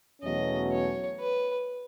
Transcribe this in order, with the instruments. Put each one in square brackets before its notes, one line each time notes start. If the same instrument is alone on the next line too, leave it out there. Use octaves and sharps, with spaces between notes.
[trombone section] E2 B2 F#3 A3 C#4 [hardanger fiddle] D#5
[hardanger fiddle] C#5
B4